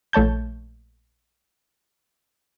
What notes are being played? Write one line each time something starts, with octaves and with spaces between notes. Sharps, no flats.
A#1 A3 C#5 A5 G6